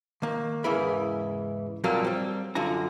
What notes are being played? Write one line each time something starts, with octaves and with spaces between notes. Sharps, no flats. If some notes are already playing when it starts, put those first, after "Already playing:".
D#3 A#3
E2 G#2 C#3 E3 A#4 B5
F2 A#2 F#3 G3 A#3
G3 C4
F#2 D3 F4 F#4 A#5